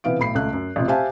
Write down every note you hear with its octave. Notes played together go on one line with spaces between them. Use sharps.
C3 E3 B3 F5 D7
B1 A2 B5 C7
C#2 A3 F#6
F#2
A1 C3 F4
G4 C5 E5 F5 G#5 A5